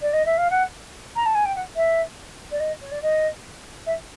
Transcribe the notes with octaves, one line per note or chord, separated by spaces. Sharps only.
D5
D#5
E5
F5
F#5
A#5
A5
G#5
G5
F#5
E5
D5
D#5
C#5
D5
D#5
E5